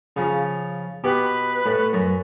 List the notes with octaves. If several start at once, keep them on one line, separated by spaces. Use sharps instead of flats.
C#3 F3
B2 G4 B4
A2
F#2